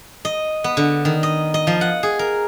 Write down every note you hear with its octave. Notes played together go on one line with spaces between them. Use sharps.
D#5
B3
D3
D#3
D#5
D#5
F3
F#5
G#4
A#4